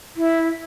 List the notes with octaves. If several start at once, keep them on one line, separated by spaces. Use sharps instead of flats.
E4